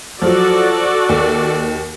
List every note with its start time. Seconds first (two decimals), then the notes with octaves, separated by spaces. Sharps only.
0.22 F3 F#3 F#4 A4 D5
1.09 D#2